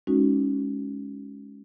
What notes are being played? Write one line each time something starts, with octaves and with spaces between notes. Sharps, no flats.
G#3 C#4 D#4 F#4